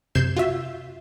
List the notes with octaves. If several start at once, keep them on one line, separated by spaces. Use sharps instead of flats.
F#2 C3 G6 G#6 C7 E7
F4 F#4 E5